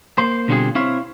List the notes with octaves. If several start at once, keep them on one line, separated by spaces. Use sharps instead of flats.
A#3 C5
B2 D3 G3 C4 F4 G#4
C4 E4 C5 C#5 E5 F5